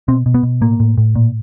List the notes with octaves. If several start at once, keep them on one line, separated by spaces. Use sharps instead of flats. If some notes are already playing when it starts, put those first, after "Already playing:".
B2 C4
B2
B3
B2
A2 A#3
A2
A2
A#2